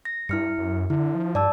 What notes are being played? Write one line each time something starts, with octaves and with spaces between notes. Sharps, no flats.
A#6
G2 E4 F6 C#7
F#2
D3 E4
F3
G2 D5 A5 E6